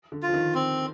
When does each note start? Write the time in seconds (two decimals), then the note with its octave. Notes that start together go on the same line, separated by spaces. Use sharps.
0.12 D3
0.23 F4
0.28 F3
0.34 D#3
0.55 C4